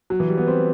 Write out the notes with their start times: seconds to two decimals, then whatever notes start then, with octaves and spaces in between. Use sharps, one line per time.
0.10 F#3
0.20 E3
0.28 G3
0.38 B3
0.47 C4